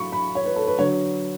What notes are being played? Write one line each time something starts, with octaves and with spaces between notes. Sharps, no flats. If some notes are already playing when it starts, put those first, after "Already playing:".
Already playing: F#3 B5 C#6
B5
C#5
B4
A4
B4
D3 F#3 C#5